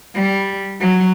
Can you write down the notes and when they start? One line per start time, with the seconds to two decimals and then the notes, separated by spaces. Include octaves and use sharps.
0.14 G3
0.80 F#3